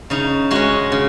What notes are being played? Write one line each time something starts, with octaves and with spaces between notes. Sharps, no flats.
C#3 D#4
G#3 C#4 F#4
C#3